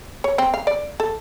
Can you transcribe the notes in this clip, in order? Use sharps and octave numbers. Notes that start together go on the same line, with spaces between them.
C#5
C4
F5
D5
A4